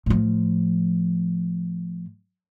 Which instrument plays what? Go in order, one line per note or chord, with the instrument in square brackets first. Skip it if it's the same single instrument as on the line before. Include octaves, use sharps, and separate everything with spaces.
[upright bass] A2 F3